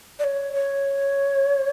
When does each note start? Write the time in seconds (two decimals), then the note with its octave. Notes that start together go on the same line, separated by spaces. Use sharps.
0.19 D5
0.24 C#5
0.53 C#5